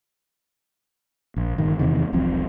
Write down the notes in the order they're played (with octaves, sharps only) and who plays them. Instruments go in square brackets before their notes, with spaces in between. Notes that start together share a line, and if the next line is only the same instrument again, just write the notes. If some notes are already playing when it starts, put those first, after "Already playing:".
[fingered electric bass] A#1
G1 D#3
E2 C3 D#3
E1 B1 F3 C4